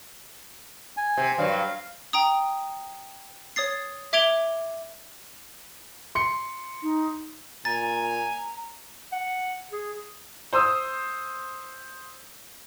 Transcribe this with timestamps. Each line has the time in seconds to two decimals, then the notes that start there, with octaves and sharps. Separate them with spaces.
0.97 G#5
1.17 C3
1.38 G2 F#3 F5
2.13 G5 A#5 D#6
3.56 C#5 D#6 A6 C7
4.13 E5 D6 G#6 D7 F7 G7
6.15 C6 C#7
6.82 D#4
7.65 A#2 G#5 A#5 A6
9.12 F#5
9.72 G#4
10.53 C5 C6 D#6 E6